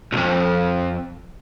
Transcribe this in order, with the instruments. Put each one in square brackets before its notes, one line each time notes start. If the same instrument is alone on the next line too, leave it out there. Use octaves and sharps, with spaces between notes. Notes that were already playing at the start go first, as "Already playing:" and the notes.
[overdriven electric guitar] B1 F2